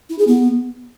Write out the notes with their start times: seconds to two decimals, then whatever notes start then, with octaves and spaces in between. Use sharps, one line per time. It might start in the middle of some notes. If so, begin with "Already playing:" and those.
0.10 E4
0.19 G#4
0.28 B3